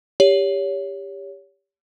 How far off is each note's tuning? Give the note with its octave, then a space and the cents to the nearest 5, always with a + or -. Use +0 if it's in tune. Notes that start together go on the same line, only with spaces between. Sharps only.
G4 +20 C#5 +25